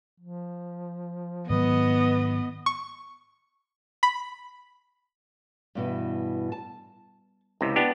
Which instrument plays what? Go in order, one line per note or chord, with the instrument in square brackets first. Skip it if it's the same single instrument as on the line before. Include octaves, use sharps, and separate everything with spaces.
[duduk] F3
[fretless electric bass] G#2 D#3 F#3 [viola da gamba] B3 [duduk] B4 [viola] D#5
[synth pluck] C#6
B5
[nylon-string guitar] G2 B2 E3
A5
[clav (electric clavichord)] C#2 C3 [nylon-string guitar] E4 D#5
[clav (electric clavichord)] B3 D4 G4